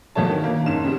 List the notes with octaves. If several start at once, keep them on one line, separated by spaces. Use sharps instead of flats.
D#2 B2 F3 A3 C#5 A5
D#3
A#3
F#1 G#2 C#4 E7
C#3 G3 B3